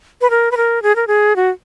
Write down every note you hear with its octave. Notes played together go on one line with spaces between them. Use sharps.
B4
A#4
B4
A#4
G#4
A#4
G#4
F#4